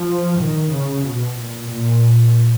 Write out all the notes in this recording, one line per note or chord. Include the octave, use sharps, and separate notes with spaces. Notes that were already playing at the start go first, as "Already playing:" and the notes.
Already playing: F3
D#3
C#3
B2
A#2
A#2